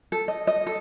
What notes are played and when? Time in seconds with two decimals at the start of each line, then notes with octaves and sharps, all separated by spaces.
0.12 A4
0.28 D#5
0.47 D#5
0.67 A4